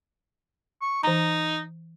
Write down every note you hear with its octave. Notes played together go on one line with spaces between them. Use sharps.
C#6
E3 D#4 A#5